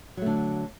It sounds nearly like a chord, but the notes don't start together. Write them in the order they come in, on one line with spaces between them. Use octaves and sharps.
F#3 A3 D3